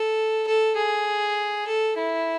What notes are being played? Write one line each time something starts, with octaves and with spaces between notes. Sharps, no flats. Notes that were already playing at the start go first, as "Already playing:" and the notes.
Already playing: A4
A4
G#4
A4
E4